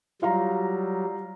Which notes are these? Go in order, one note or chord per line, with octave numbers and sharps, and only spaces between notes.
F#3 G3 F4 F5 A#5